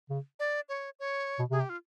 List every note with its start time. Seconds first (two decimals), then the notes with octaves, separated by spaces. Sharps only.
0.10 C#3
0.39 D5
0.69 C#5
0.99 C#5
1.39 B2
1.50 C3 G#4
1.60 G4
1.69 F4